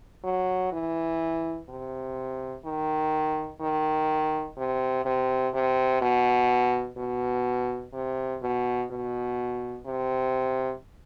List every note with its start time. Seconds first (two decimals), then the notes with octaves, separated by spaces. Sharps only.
0.24 F#3
0.73 E3
1.70 C3
2.65 D#3
3.61 D#3
4.58 C3
5.05 C3
5.54 C3
6.02 B2
6.98 B2
7.94 C3
8.42 B2
8.91 B2
9.86 C3